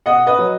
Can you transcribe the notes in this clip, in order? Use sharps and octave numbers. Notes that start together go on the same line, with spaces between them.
B2 D#5 F#5
B4 D#5
F#3